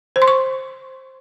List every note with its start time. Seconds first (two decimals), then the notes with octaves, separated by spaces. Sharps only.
0.16 C5
0.22 C6
0.28 C#6